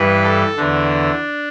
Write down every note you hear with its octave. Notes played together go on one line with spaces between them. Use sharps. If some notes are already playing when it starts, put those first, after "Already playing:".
Already playing: G2 E3 B4
A4
E2 D3 D4